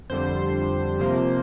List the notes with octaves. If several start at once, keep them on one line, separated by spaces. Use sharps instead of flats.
F2 D3 G3 C5
C3 F3 A#3